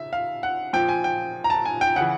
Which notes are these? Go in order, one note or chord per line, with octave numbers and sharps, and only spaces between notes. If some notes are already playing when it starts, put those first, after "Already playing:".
Already playing: C#3 E5
F5
F#5
A#2 F3 G5
G#5
G5
A#5
A5
G#5
G5
C#3 E3 F#5